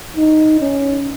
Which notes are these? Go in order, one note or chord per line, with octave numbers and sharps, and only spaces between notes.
D#4
C#4